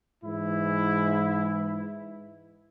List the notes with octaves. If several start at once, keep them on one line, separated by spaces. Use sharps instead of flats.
G#2 E3 E4